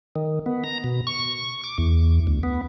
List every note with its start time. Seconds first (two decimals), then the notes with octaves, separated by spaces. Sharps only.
0.16 D#3
0.46 B3
0.64 A#5
0.84 B2
1.07 C#6
1.64 D6
1.78 E2
2.27 D2
2.43 B3